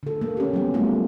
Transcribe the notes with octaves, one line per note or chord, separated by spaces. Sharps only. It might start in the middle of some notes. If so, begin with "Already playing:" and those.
D3 A4
A#3
C#4 G4
F#3 G3 B3
G3 A3 C4 F4